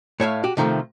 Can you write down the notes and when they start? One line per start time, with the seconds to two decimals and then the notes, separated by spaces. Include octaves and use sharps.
0.20 A2 C#5 E5 F5
0.44 F#4 G4
0.57 C3 D#3 F3 A3